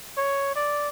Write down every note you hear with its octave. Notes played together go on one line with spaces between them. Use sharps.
C#5
D5